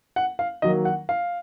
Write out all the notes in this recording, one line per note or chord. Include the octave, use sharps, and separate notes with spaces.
F#5
F5
D#3 F#3 A#3 D#5
F#5
F5